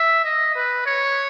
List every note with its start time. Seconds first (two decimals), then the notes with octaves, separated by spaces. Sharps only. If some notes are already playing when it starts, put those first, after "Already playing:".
Already playing: E5
0.25 D#5
0.55 B4
0.86 C#5